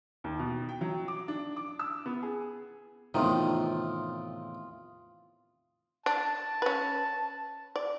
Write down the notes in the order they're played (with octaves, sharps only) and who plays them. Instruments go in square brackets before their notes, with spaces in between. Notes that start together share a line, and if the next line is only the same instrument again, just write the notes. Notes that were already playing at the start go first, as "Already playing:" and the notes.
[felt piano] D#2
B2
G5
F#3
D6
D4
D6
E6
B3
G#4
[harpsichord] E2 A2 C3 [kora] D#3 F3 [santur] F4 D#6
[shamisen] D4 [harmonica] A5
[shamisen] C#4 B4
D5